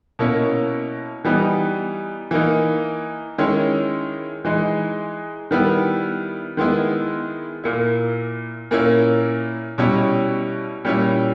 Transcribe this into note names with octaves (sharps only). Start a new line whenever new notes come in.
B2 A#3 C#4 E4
E3 G3 B3 D#4
E3 A#3 D#4
D#3 G#3 C#4 E4
E3 G#3 D#4
D#3 G3 B3 E4
D#3 G#3 B3 E4
A#2 A#3 E4
A#2 A#3 C#4 E4
B2 G3 C#4 E4
A#2 G3 C#4 E4